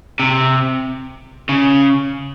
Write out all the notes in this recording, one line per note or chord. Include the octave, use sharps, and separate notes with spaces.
C3
C#3